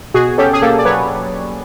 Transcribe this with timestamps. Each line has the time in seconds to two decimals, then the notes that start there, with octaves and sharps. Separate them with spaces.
0.14 B2 F#4 G#4
0.38 C#4 G4 A4
0.53 G#4
0.62 A#3 G4 A4
0.79 D5
0.85 F#3 B4 C#5